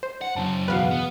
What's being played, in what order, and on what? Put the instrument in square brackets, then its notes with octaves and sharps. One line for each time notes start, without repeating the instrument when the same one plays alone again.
[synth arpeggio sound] C5
[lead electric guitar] F#5
[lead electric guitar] F#2 C#3 [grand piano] A5
[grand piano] E2 B2 [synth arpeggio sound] B4 F5 F#5
[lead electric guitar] B3